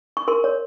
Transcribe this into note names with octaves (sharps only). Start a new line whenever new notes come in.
C#6
A#4 C6
C#5